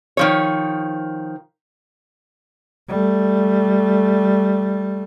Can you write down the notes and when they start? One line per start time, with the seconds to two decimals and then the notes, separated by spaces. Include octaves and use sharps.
0.17 D#3 F3 C#5
2.88 G3 A3